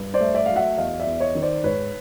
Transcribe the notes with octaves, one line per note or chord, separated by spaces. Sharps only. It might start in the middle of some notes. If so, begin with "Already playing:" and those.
Already playing: G2
C5 D5
A3
D5 E5
F#3 F5
E5 F#5
E2 D#5 F5
D5 E5
E2
C#5 D#5
D#3
C5 D5
G#2 B4 C#5